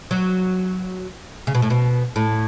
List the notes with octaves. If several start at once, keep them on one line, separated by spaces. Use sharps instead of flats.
F#3
C#3
B2
A2
B2
A2